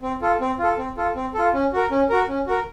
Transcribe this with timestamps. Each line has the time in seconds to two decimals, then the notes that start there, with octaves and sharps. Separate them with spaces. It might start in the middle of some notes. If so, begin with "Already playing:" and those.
0.02 C4
0.22 F4 A4
0.41 C4
0.59 F4 A4
0.78 C4
0.97 F4 A4
1.15 C4
1.34 F4 A4
1.54 C#4
1.73 F#4 A#4
1.91 C#4
2.10 F#4 A#4
2.28 C#4
2.47 F#4 A#4